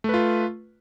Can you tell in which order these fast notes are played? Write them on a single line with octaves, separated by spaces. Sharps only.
A3 B4 F4